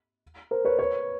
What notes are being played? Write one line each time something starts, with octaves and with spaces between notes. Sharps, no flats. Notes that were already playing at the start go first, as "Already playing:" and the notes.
A#4 C5
B4 C#5
B4 C#5